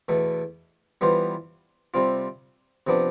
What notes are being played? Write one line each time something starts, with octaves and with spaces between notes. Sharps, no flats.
E2 B2 A3
E3 G3 B3 F4 C5
C3 G3 C4 F4
C3 F3 B3 D4